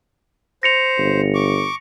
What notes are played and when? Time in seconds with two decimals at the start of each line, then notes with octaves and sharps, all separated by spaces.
0.63 C5 A#6 C#7 F7
0.98 G1
1.35 C#6 D6